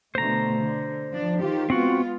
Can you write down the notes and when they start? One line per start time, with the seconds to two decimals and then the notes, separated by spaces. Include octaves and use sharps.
0.15 B2 D3 A3 C5 A#5
0.59 D3
1.11 F3 D4
1.40 D#3 F4 G4
1.70 G#3 B3 C4 F4 F#4